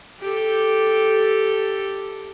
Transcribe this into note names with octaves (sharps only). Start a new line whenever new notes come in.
G4 A4